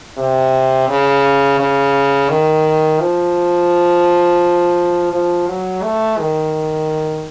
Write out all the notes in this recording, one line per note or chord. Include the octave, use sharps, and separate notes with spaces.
C3
C#3
C#3
D#3
F3
F3
F#3
A3
D#3